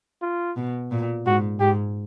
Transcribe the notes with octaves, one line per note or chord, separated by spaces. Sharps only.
F4
B2
A#2
G#2 F#4
G#2 G4